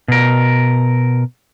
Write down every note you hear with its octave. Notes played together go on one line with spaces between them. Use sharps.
B2 A#4